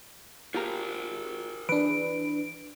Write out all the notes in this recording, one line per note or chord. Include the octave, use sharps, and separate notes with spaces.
F4 G4 G#4 A#4 A#5
E3 D4 B4 D7